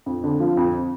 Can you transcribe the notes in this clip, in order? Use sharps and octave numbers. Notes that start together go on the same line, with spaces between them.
F2
D3
F3
F2